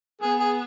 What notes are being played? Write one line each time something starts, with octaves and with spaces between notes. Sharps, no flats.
B3 G#4
G#4